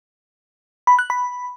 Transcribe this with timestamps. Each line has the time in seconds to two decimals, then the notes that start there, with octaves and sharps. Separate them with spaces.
0.87 B5
0.99 F#6
1.10 B5